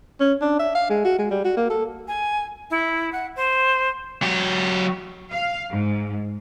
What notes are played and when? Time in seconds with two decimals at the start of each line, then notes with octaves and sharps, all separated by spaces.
0.20 C#4
0.41 D4
0.59 E5
0.75 F5
0.90 G#3
1.05 F#4
1.19 G#3
1.31 G3
1.45 F#4
1.57 A#3
1.70 A4
2.07 G#5
2.70 E4
3.12 F#5
3.36 C5
4.22 F#3 G4
5.31 F5
5.70 G#2